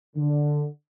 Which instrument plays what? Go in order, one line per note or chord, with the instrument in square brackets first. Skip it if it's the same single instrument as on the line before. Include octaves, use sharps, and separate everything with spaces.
[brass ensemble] D3